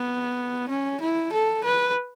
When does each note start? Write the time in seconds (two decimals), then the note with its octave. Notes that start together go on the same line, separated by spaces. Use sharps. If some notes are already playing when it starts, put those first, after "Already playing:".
Already playing: B3
0.69 C#4
1.01 E4
1.32 A4
1.64 B4